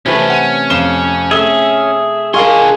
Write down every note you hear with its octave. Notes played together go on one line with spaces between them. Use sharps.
C3 E3 A3 C#4 B4
C#4 F#5 D#7
F2 F5 E7 G7
A3 G#4 E5 G7
G#3 D4 F4 G#4 A#4 F5 C6 C#6